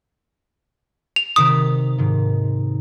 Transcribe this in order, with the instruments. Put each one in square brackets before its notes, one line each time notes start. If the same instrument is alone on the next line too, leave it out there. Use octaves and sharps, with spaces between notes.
[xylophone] F7
[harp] C3 D#3 B6 [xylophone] D#6
[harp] G#2 D#3